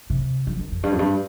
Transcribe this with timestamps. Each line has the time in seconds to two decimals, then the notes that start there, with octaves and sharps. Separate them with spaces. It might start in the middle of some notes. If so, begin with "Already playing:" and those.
0.10 C3
0.47 F3
0.59 D#3
0.72 F2
0.83 G2
0.92 F2
0.99 G2